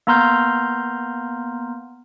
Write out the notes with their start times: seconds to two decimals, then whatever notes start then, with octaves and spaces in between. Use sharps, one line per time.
0.07 A#3 B3 A#5 C6 F6 G6